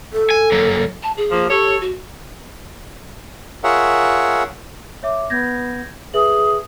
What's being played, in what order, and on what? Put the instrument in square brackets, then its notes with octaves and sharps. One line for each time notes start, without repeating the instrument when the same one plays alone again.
[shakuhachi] A4
[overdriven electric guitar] G#5
F#3 A#3
[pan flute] A5
G#4
[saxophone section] F3 A#3
[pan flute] G4 [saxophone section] A4 C#5
[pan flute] F#4
[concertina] F4 G#4 A#4 C#5 E5 F#5
[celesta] C#5 E5 D6
[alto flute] B3 [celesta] G6 G#6 A#6
[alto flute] G#4 [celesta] B4 E5 F#7